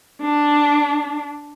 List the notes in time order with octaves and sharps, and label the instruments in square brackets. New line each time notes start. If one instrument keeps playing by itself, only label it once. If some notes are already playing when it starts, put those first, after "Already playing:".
[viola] D4